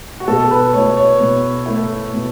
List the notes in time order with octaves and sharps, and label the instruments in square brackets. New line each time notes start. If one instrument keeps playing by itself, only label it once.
[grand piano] F#4
[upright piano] B2 [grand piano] A4
[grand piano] B4
[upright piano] A3 E4 [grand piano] C#5
[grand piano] C#5
[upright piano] B2
A3 E4
B2